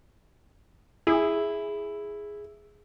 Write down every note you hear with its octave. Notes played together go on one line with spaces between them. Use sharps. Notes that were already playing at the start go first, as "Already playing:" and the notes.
E4 G#4